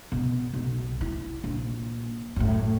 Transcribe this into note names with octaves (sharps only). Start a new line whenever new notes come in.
B2
B1
E4
A#1
F#2 A2